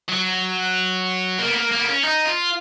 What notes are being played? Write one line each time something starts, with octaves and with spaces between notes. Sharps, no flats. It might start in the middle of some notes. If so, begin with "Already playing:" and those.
F#3
A#3
B3
A#3
A#3
B3
C#4
D#4
F4